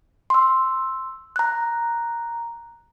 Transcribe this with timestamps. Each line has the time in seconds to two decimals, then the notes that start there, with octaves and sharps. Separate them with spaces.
0.30 C6 E6
1.36 A#5 F#6